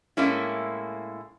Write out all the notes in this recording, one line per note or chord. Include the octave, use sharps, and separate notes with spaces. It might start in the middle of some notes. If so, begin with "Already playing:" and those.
A2 G#3 A#3 C#4 E4